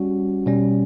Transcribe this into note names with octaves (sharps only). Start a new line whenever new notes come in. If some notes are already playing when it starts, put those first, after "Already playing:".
Already playing: G3 C#4 F#4
B2 G3 C#4